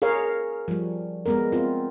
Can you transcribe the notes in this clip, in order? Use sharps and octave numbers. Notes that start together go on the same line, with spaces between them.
G#4 A#4 C#5 F5
F3 G3
G#3 B3 A#4
C4 F4